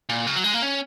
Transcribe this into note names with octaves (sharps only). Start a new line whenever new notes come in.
A#2
C#3
F#3
G#3
A#3
C#4